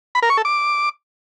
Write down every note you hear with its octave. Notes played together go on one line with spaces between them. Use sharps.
B5
A#4
C#6
A4
D6